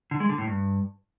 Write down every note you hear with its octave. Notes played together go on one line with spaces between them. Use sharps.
D3
G#3
D3
A2
G2